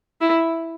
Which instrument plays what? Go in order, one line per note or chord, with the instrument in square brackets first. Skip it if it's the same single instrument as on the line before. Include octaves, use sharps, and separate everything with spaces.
[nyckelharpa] E4